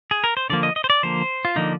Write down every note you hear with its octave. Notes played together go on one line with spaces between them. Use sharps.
G#4
A#4
C5
D3 F3 A#3 D5
D#5
D#5
C5
D5
D3 F3 A#3 C5
F4
D3 F3 A#3 D#4